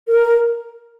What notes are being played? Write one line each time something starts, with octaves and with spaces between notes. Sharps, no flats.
A#4